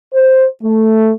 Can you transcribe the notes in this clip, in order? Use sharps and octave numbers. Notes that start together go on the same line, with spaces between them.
C5
A3